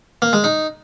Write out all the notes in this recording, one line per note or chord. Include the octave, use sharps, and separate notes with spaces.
A#3
G#3
D#4